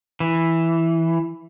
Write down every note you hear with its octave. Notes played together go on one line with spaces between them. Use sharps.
E3